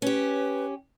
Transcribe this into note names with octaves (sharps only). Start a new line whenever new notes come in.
C#4 G4 B4